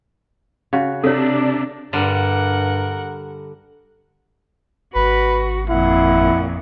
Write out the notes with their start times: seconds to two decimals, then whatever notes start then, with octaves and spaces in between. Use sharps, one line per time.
0.73 C#3 F#4
1.04 C3 D4 A4 C#5
1.93 G2 D3 G3 A#4 F#5
4.95 G#1 F#4 B4
5.70 F2 A#2 E4 F#5